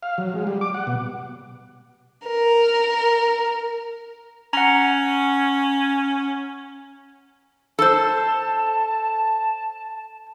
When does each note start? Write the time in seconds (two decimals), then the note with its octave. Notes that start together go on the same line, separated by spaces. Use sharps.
0.03 F5
0.18 F#3
0.35 G#3
0.47 G3
0.61 D6
0.74 F#5
0.87 B2
2.27 A#4
4.53 C#4 F#5 A#5
7.79 A4 C5 A5